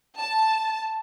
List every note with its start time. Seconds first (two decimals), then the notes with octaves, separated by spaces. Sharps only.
0.18 A5